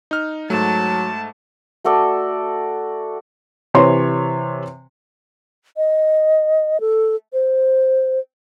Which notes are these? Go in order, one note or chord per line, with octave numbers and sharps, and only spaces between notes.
D#4 F6
G#2 F#3 A3 A5
A3 F#4 A4 D5
C3 E3 C#5 C6
D#5
A4
C5